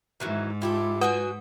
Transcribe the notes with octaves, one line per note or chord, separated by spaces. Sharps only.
G#2 D#3 E3 F#3
E4 F4 G4 A4
F#3 F#4 B4 F#5 G#5 D#6